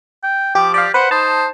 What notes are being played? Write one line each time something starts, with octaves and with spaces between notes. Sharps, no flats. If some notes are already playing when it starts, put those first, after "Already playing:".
G5
F3 G4 D6
G4 D5 F5
B4 C5 F#5
D#4 C5 A5